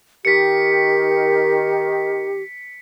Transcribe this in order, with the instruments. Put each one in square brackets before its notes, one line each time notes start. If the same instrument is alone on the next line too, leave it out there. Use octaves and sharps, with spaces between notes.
[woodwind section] D#3 [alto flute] G4 [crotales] B6 C#7